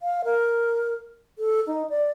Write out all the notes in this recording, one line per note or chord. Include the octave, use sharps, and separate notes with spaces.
F5
A#4
A4
D#4
D5